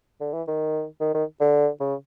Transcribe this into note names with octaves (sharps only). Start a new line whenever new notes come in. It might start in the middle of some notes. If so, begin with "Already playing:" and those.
D3
E3
D#3
D#3
D#3
D3
C#3